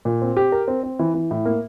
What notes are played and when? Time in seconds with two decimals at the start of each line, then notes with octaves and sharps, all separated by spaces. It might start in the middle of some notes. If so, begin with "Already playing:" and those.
0.05 A#2
0.22 C4
0.37 G4
0.52 A#4
0.68 C4
0.83 C4
0.99 E3
1.15 E3
1.31 A2
1.45 A#3